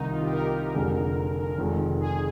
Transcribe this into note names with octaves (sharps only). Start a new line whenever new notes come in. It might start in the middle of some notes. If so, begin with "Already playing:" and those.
Already playing: C2 C3 D#3 D#4
F4
G4
A#4
F1 F2 D3 G#3
F1 F2 D#3 G#3
G#4